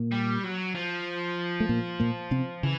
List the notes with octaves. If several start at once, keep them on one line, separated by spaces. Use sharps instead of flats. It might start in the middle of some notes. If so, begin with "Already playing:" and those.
Already playing: A#2 A#3
G3
F#3
F3
A3
A#2 A#3
A#2 A#3
C3 C4
C#3 E3